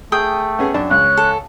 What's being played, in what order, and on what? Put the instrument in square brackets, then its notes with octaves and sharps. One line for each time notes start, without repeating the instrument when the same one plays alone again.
[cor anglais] A3 [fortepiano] G#4 D#6 [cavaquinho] G5
[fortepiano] B3 C#4 G#4
F#2 D4 A5
[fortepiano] C#2 [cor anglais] C#5 [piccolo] F#6
[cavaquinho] A4